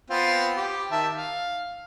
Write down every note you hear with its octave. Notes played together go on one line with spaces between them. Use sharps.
B3 C4 F4
G4
D#3 E5 A5
F5